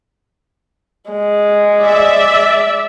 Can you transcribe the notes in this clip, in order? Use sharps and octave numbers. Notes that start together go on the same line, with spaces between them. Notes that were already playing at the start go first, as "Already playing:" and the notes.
G#3
D5 E5